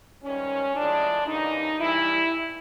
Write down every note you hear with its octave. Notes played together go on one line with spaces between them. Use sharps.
G#2 D#3 G3 C#4
A2 F3 G#3 D4
D#2 C#3 E3 D#4
G2 E3 G3 E4